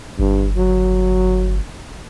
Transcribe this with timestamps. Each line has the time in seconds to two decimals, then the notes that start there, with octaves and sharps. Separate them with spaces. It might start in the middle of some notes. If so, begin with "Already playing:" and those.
0.19 G1 G2
0.57 F#3